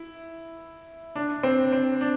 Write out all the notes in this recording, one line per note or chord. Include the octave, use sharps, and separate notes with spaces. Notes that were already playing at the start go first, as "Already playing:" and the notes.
Already playing: E4
D4
C4
C4
D4